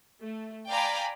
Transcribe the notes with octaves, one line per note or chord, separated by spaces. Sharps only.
A3
D5 F5 G5 G#5 A#5 B5